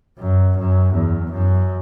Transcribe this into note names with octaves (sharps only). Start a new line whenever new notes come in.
F#2
F#2
E2
F#2